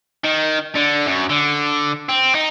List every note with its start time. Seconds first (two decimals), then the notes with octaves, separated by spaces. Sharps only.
0.24 D#3
0.76 D3
1.07 F#2
1.30 D3
2.09 C4
2.35 D#4